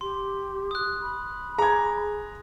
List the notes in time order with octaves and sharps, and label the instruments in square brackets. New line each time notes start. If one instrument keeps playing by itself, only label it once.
[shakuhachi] G4 [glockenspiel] C6
[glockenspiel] D#6 F#6
[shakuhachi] B5
[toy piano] G#4 G#5 [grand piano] A#5 G#6